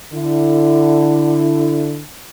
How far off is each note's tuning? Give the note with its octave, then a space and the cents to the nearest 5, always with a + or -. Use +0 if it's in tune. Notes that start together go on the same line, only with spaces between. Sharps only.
D3 +10 E4 +15